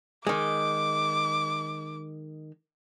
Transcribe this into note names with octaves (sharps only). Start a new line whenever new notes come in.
D#3 G#3 D6